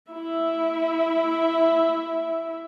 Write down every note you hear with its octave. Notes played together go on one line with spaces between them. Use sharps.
E4 E5